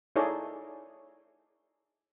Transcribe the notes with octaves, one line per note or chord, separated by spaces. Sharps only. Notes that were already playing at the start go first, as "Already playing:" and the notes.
D#4 E4 G#4 A4 C#5 D5